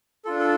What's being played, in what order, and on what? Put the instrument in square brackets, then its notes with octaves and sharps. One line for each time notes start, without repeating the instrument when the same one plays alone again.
[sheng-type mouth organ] D4 F4 A4
A4